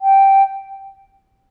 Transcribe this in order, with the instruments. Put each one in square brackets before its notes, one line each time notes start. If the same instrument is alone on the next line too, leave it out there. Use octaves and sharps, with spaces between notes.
[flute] G5